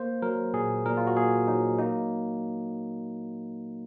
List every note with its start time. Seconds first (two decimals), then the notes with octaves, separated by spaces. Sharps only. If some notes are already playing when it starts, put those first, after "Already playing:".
Already playing: A#3 C5
0.22 F#3 A#4
0.54 A#2 G#4
0.86 A#2 A#4
0.97 F4
1.07 F#4
1.17 A#3 G#4
1.48 F#3 D#4
1.79 A#3 D#4